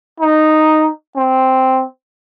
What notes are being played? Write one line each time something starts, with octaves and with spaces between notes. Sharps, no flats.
D#4
C4